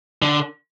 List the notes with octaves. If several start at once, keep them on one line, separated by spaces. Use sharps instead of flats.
D3